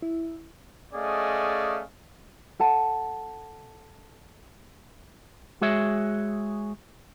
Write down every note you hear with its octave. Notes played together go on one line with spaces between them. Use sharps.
E4
A3 C#4 G#4 D5 D#5 F5
A4 F#5 A5
G#3 F#4 G#4 C#5 E5